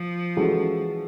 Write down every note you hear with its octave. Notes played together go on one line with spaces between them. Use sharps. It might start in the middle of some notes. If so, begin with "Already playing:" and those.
Already playing: F3
E3 G#3 C#4 F#4 A4